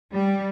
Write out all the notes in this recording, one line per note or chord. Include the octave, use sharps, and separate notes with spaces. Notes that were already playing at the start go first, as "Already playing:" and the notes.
G3